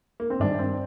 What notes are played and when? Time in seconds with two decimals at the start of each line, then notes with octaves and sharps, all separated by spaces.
0.20 A#3
0.30 C4
0.40 G2 D#3 G3 D4
0.59 C4